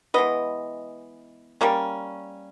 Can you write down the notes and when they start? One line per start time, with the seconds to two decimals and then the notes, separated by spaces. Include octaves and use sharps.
0.14 E3 G#3 B3 B4 D#5
1.61 G3 A#3 C#4